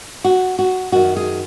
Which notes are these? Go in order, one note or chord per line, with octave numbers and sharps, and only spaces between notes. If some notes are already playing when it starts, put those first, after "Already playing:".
F#4
F#4
F#2 D#3 F#4
G#4